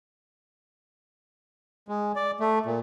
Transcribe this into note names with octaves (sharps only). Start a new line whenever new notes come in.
G#3
D5
A3
A#2